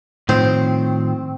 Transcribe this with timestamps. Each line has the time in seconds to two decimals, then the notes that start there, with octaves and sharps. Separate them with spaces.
0.29 A2 D#3 F3 C4